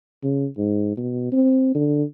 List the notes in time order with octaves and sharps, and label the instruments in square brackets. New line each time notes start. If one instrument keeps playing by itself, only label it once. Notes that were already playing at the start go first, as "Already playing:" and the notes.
[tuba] C#3
G#2
B2
C4
D3